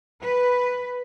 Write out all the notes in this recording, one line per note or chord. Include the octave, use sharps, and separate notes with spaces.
B4